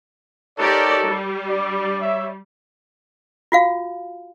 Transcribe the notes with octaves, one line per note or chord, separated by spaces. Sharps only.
D#4 G4 A4 A#4 C#5 D5
G3
D4 D5
C#5 E5
F4 F#4 F5